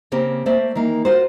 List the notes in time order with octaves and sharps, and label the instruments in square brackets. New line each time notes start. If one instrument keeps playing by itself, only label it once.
[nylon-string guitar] C#3 A#3 C4 G4
A3 A#3 C5 D5 E5
D#3 E3 A#3
F4 F#4 A#4 C5